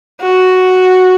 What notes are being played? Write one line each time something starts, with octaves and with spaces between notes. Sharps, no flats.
F#4